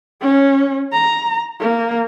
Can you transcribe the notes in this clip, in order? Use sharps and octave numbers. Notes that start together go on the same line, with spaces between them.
C#4
A#5
A#3